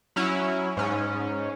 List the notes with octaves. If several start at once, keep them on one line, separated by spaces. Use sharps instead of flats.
F#3 C#4 E4
G#2 C#4